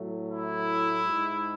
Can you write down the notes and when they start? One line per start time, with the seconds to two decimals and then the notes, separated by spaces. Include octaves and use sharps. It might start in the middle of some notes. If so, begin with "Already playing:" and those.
Already playing: A2 F#3 A3
0.27 E4
1.05 G#2 G#3